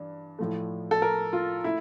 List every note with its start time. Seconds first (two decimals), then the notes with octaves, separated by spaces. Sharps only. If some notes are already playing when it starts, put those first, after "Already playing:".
Already playing: G2 E3
0.39 A2 F3 A3
0.91 A4
1.02 A#4
1.33 F4
1.64 A3 E4